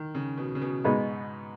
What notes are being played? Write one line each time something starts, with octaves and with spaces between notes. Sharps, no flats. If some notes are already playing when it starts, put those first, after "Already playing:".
Already playing: D#3
C#3
B2
C#3
B2
G#2 B2 G#3 B3 D#4